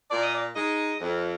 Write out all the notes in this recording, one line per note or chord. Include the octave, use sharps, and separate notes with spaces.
A#2 D5
D#5
D5
G#3 D#4 D#5
F2